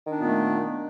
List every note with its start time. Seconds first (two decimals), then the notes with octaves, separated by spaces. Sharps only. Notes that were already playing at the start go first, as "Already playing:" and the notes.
0.06 D#3
0.11 D4
0.15 B3
0.20 A#2
0.24 A3